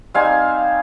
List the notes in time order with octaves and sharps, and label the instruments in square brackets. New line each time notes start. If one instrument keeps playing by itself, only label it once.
[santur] G3 C4 D#4 F5 G#5